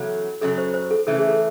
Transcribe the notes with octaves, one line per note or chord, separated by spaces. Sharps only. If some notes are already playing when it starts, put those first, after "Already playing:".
Already playing: E2 C#3 F#3 A4
F#2 C#3 F#3 A4
C5
C5
A4
C#3 E3 A3 A4
G#4
A4